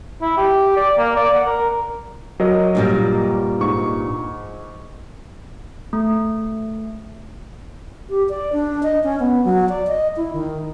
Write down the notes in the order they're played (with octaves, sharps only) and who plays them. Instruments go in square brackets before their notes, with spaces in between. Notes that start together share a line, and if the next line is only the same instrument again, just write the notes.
[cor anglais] E4
G4
D5
A#3
D5
F#5
A#4
[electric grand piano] F#3 A#4 D#5
[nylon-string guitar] G2 A#2 G3
[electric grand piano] G#2 C#6
[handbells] A3
[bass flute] G4
D5
D4
D#5
C#4
B3
F#3
D5
D#5
E4
D#3